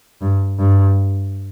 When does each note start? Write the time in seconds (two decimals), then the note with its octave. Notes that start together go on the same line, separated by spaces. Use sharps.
0.22 G2
0.59 G2